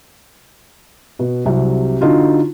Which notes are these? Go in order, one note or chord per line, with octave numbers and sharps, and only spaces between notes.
B2
C2 C3 F#3
D3 D#4 F4 F#4